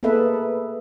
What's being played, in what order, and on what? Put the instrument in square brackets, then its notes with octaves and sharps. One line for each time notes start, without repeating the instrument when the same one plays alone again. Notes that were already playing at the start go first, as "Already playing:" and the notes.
[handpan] A#3 B3 G#4 A4 B4 E5